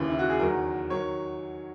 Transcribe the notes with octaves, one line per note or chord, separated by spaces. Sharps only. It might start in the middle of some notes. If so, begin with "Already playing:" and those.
Already playing: D#2 C#3 E3
E4
F#4
G#4
E2 D#3 F#3 A#4
D#3 F#3 C#5